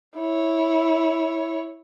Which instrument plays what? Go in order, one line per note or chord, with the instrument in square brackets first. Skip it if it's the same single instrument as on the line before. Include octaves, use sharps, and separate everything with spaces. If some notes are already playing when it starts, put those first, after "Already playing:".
[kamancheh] E4 C#5